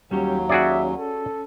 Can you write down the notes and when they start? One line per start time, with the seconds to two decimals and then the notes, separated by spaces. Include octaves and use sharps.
0.11 D#2 F#3 G3 C#4 G4
0.49 C#4 F#4 G#4 D5 E5
0.99 A4